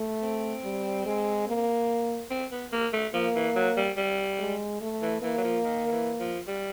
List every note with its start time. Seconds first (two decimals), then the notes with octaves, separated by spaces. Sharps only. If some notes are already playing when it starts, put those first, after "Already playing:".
Already playing: A3
0.22 C4
0.64 G3
1.06 G#3
1.48 A#3
2.31 C4
2.52 B3
2.73 A#3
2.93 A3
3.14 F3 A#3
3.36 E3
3.56 F#3
3.77 G3
3.97 G3
4.39 G#3
4.81 A3
5.02 E3
5.22 E3 A#3
5.38 F#3
5.44 F3
5.64 D#3
5.87 D#3
5.92 E3
6.20 F3
6.47 G3